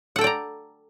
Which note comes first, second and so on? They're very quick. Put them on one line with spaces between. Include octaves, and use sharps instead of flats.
F#5 A4 G5 D5 A#5